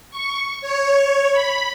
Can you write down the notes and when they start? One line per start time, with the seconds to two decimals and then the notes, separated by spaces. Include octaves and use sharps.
0.11 C#6
0.61 C#5
1.32 B5